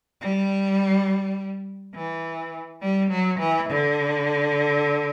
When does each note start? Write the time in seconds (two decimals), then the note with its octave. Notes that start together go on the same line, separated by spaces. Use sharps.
0.21 G3
1.94 E3
2.81 G3
3.10 F#3
3.39 E3
3.69 D3